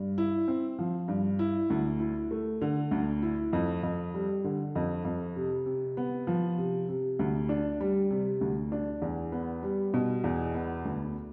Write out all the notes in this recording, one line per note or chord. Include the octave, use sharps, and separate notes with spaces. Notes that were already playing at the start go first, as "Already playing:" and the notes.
Already playing: G2
E4
C4
F3
G2
E4
D2
E4
A3
D3
D2
E4
F2
F2
G3
D3
F2
F2
C3
C3
B3
F3
C3
C3
D2
D4
G3
C3
D2
D4
E2
B3
G3
B2
E2
B3
D2